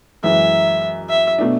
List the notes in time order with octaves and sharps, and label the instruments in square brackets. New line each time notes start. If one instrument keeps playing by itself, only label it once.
[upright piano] F#2 E3 G#3 [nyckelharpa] E5
[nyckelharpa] E5
[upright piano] B2 A3 D4